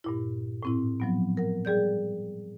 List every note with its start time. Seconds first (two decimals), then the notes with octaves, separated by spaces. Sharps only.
0.04 G2 A#2 E4
0.63 A2 C4 E4
1.00 F3 F#3 B3
1.37 A#4 F#5
1.65 G3 G#4 D5 G6